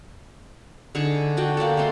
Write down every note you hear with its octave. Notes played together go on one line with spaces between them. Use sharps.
D3 D#4 G#4 C#6
D4 F#4 G5
A#3 D4 G4 A4
G#3 A3 A4 C6